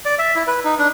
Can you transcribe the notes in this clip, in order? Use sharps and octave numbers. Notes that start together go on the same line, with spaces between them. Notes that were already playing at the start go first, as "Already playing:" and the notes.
D5
E5
E4
B4
D#4
D4